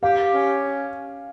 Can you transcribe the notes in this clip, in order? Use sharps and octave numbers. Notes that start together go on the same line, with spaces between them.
G4 F5
C#4